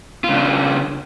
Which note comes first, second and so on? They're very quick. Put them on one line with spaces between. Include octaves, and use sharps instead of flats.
F4 C#3 D4